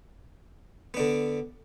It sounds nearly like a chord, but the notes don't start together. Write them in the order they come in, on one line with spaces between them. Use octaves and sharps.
B3 D4 D3